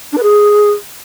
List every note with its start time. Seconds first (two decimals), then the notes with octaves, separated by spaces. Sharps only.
0.12 D4
0.18 B4
0.23 G#4